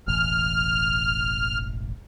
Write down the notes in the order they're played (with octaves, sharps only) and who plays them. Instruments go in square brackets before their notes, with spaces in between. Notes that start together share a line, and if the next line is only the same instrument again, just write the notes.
[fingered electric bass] E1 A1 [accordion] F6